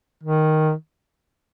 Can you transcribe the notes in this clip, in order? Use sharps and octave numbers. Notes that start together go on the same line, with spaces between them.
D#3